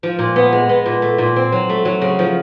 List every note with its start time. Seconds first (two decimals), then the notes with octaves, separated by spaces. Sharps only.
0.03 F3
0.19 A#2
0.36 B3
0.52 G#3
0.69 B3
0.86 A#2
1.02 A3
1.18 A#2
1.36 C4
1.52 F#3
1.69 A3
1.85 F#3
2.01 C#3
2.19 F3